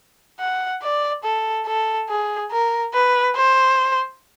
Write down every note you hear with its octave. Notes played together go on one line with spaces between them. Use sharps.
F#5
D5
A4
A4
G#4
A#4
B4
C5